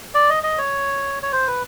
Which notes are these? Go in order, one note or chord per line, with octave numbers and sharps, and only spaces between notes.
D5
D#5
D#5
C#5
C#5
C5
B4